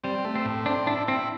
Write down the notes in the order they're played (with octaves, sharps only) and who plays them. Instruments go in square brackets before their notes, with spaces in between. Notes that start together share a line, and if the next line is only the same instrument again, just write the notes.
[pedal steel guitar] G3 [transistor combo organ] C4
[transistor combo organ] A3
[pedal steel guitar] C4
[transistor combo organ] A2
[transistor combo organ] C4 [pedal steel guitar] D4
[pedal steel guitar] D4 [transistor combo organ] E4
[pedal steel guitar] C4 [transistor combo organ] E4